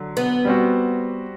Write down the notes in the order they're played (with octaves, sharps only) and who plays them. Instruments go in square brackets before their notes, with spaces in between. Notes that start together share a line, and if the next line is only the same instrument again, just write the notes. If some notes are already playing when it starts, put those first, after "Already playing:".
Already playing: [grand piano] D3 F#3
[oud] B3
[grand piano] G3 C4 F#4